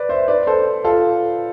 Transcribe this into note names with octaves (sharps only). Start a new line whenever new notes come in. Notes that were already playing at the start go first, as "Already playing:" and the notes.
Already playing: B4 D5
C5 E5
B4 D5
A4 C5
F4 A4